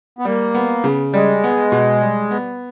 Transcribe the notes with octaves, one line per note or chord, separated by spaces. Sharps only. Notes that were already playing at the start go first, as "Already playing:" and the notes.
B3
G3 A#3
B3
C#3
G3 G#3
B3
B2
G3
B3